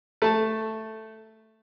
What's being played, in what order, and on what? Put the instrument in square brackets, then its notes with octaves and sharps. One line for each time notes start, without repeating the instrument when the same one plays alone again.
[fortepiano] A3 A5